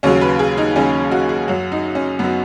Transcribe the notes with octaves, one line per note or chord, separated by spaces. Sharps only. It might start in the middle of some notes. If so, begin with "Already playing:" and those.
D#2 C#3 F#3 C#4
B4
G#4
D#4
D#2 C#3 F#3 C#4
F#4
G#4
F#2 F#3 F#4
D#4
C#4
F#2 F#3 B3